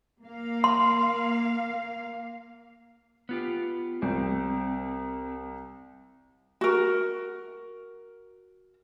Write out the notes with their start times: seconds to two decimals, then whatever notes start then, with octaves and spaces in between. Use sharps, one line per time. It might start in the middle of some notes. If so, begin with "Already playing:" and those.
0.23 A#3 F5
0.64 C6
3.29 B3 F4 G4
4.02 C2 C4
6.61 F#4 A#4